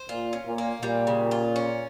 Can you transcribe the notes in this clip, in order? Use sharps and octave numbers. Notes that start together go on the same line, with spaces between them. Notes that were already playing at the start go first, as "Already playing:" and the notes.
Already playing: C5
A#2 F4
C#4
A#2
A#3
A#2 G3
C#3
F4
C#4